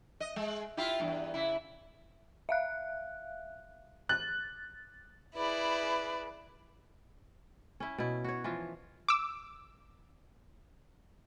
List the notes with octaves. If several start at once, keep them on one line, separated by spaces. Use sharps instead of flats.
D#5
G#3
E4 F4 G4
E2 G2
C#3 E4
E5 F5 F#6
F#6 A6
E4 G#4 B4 D5
C#4 E4
B2 E4
F#4 C#5
E3 F3 F4
D6 E6